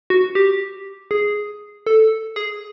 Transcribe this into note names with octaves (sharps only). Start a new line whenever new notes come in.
F#4
G4
G#4
A4
G#4